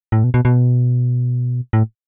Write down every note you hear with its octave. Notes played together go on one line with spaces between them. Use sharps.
A2
B2
B2
B2
A2